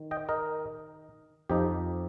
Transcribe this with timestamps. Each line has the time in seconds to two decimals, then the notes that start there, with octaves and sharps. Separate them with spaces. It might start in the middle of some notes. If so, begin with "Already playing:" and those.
Already playing: D#3
0.11 D#5 G5
0.29 A#4 D#5
1.49 F2 F3 D#4 G4